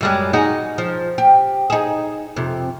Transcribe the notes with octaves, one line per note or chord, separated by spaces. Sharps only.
F#2 G3 G#3
D#4 F#4 G#4
F3
G4
D#4 G#4
F2 C3